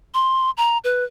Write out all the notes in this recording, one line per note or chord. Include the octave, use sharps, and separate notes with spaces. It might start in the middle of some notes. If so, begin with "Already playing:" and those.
C6
A#5
B4